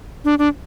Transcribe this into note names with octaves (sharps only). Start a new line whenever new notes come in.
D4
D4